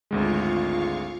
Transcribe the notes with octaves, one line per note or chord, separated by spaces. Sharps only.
G#1 D2 G#3 F4 F5 C#6